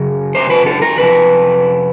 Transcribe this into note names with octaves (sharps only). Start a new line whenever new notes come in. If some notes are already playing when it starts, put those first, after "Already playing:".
Already playing: F#2 C#3
C5
B4
A4
A#4
F2 C3 B4